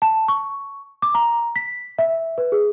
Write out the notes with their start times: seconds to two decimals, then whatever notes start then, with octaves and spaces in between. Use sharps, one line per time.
0.02 A5
0.28 C#6
1.02 D6
1.15 A#5
1.56 B6
1.98 E5
2.38 B4
2.52 G#4